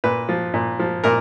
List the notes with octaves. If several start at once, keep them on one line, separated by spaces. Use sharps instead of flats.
A#2 B4
F3
A#2
F3
A#2 A#4